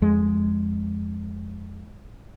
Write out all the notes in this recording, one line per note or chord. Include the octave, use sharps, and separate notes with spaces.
F2 G#3